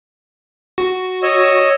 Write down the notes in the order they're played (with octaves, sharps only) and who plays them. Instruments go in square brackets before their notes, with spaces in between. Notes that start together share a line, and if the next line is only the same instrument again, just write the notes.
[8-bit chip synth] F#4
[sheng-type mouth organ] C#5 D#5 E6